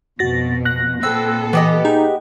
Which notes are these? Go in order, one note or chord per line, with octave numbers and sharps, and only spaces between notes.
F2 B2 F#4 A6 A#6
F#6 A#6
A#2 B3 C4 A4 E6
E3 B3 G4 D#5
D#4 G#4